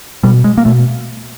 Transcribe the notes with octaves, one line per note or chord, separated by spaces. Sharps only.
B2 G3
G#3
A#3
B2 A3